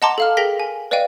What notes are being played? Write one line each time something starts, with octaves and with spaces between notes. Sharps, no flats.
D#5 F#5 A5 A#5 C6 D6
A4 F5 F6
G#4 A#4 G5 A#6 B6 G7
G#5
B4 D5 D#5 F5 G5 D#7